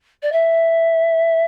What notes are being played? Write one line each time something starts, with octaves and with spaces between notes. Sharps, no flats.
D5
E5